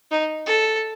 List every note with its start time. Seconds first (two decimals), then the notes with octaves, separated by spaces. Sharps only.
0.11 D#4
0.46 A4